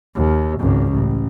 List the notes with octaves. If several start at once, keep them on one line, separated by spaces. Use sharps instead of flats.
D#2
G#1 C#2
A1